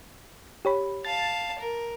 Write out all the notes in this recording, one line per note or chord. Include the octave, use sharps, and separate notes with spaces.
G4 C#5 B5
F5 A5 A6
A#4